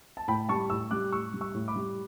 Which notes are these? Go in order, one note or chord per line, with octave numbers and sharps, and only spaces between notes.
A5
A2 G5 B5
G3 A5 C#6
A2 C#6 E6
G3 D6 F#6
A2 C#6 E6
G3
C#6 E6
A2
B5 D6
G3